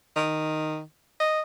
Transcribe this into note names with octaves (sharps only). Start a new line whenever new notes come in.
D#3
D#5